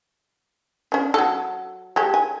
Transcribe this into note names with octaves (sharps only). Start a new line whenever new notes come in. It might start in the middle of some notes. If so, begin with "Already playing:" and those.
C#4 D4
F#3 A4
G#3 G4 A4
G#5